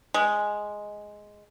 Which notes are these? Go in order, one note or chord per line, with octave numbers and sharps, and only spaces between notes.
G#3